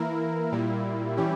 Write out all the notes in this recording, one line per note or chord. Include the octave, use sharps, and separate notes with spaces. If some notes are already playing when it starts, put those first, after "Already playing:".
Already playing: E3 A#3 E4 A#4
A#2 G3 A#3 E4
E3 G3 C#4 E4 G4